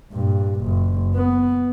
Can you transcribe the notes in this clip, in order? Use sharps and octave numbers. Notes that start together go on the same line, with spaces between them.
G2 A#2
F#1
B3